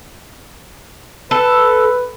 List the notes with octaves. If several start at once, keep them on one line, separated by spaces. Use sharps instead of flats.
A4 B4